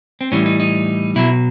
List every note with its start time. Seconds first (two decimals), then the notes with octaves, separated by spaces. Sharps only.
0.21 C4
0.32 A2 E3 G3 C#4
0.46 D#4
0.60 D#4
1.16 B2 F#3 E4